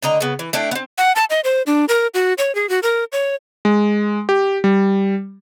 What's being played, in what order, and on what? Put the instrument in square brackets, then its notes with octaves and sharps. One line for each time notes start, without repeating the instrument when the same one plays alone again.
[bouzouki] A2 D3 D#5 A#5
C#3 B3
E3
A3 D4 E4 G5
B3 C4
[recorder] F#5
A5
D#5
C5
D4
A#4
F#4
C#5
G#4
F#4
A#4
C#5
[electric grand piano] G#3
G4
G3